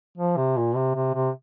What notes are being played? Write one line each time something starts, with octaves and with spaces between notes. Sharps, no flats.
F3
C3
A#2
C3
C3
C3